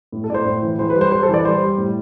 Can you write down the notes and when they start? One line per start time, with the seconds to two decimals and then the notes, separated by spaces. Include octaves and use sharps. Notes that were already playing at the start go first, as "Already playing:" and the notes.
0.12 A2
0.24 A4
0.29 A2 D5
0.34 C5
0.45 A2
0.62 E3
0.78 E3 C5
0.90 B4
0.95 G3
1.01 C5
1.12 G3 C5
1.23 A4
1.29 E3
1.34 D5
1.45 G3 C5
1.62 G3
1.78 A2